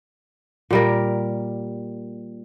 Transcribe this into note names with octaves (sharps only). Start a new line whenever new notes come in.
A#2 G3 A#4